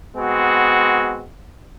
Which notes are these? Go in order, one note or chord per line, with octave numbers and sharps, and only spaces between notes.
G#3 B3 C4 F#4